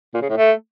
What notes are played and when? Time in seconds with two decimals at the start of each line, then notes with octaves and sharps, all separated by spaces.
0.14 A#2
0.22 C#3
0.29 A2
0.37 A3